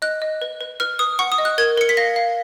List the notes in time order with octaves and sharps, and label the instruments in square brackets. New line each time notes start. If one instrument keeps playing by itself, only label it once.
[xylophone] D#5 F#6
D#5
B4
B4
B4 F6
B4 D#6
F#5 C#6
D#6
D#5
F#6
A#4 G#6
A#4 C#7
B6
F5 A#6
F5